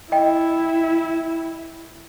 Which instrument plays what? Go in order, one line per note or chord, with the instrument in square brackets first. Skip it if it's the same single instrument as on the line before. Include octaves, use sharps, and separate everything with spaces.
[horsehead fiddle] E4 [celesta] D#5 G5